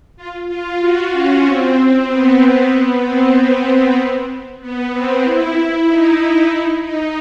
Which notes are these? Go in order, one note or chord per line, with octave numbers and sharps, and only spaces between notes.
F4
F4
F#4
C#4
C4
C4
B3
B3
C4
B3
C4
E4
D#4
E4
D#4